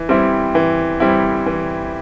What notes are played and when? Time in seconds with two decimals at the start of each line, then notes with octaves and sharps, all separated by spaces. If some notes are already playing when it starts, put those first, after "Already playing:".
Already playing: E3
0.09 G3 C4 E4
0.55 E3
1.00 G3 C4 E4
1.46 E3